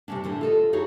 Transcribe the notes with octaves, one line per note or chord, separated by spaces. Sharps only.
C3 G3 A3 C#4 D4
A2 D3 A3 A4
F4 A4 D#5
D#4 E4 F#4 G#4 B4 C#5